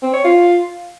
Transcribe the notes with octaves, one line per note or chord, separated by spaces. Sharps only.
C4
C#5
F4